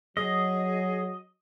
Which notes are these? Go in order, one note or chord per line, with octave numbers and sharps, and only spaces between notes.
F#3 G#4 D#5